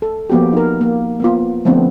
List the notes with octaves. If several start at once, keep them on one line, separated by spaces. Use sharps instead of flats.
A4
F3 A#3 B3 F#4 G4
D#4 A#4
A#3
A#3 B3 F4
D3 F3 A3 B3 C4 D4